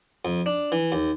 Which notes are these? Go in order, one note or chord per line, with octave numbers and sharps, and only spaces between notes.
F2
D4
E3
D#2